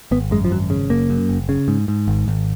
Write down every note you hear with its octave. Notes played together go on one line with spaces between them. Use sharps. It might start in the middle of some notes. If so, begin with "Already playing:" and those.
G#1 B3
F#2 G#3
F3
G#1 F#3
C#3
F#1 A#3
F#2
F#1
C#3
G#2
G#2
G#1
G#1